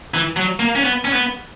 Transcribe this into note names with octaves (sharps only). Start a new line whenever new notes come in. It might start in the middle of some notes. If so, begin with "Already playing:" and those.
E3
F#3
A#3
C#4
B3
C#4
B3